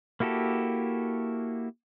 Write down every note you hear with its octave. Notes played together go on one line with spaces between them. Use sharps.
A#3 E4 F#4 G4 A4